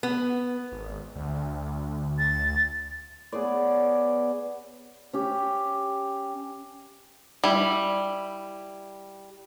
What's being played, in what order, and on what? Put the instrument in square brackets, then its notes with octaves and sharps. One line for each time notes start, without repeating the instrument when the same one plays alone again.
[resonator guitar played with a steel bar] B3
[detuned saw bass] G#1
D2
[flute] A6
[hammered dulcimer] B3 G#4 C#5 D5
C#4 G4
[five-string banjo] G3 E4